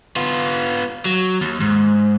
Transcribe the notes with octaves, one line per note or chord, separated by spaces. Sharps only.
B3 F4
F#3
D#2
G#2